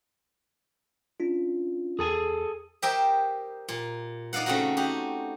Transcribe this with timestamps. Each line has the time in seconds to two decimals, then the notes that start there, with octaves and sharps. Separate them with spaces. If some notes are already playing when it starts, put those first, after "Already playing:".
1.20 C#4 D4 F4
1.99 E2 G#4 A4 G#5
2.82 G4 A#4 C5 D#5 E5 G5
3.69 A#2
4.33 D#4 D5 D#5 F5 F#5
4.46 C#3 A3 C4 D#4 F#4
4.77 D#4 F#4 G4